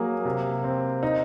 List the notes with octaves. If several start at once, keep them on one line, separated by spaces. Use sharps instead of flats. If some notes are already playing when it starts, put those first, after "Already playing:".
Already playing: F#3 A#3 G#4
C3
C4
D#4